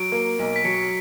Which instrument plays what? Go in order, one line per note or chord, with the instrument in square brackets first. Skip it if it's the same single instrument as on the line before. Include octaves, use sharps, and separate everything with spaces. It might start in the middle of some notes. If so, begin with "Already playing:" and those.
Already playing: [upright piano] F#3 [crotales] D7
[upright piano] A#3
B1
[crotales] B6
[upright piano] F#3 [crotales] C#7